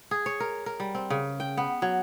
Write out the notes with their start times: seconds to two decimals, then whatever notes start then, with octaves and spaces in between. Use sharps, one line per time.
0.11 G#4
0.26 C#5
0.40 A#4
0.66 A#4
0.80 G3
0.95 C4
1.10 C#3
1.40 G5
1.57 B3
1.82 F#3